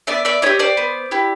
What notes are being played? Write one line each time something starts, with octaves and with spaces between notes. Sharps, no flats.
B3 D5 E5
D5 E5
E4 G4 C#5 D#5
C5 D5
B3
E4 G4